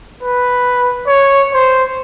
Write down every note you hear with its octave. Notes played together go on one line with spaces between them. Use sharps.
B4
C#5
C5